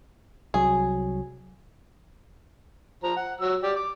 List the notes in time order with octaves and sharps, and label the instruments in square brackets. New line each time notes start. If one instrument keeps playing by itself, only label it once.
[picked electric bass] C2 F#3 [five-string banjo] G#4
[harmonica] F3 A#5
F#5
F#3 E6
G4 D5
D6